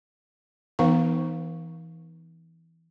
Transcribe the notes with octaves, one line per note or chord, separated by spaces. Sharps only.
E3 B3 D#4 C5 F5 C#6